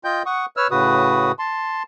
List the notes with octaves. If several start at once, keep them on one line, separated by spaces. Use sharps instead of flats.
F4 D#5 G5 G6
F#5 C#6 D#6
B4 C#5 E6 F6
A2 C#3 F#4 B4 D#6
A5 C6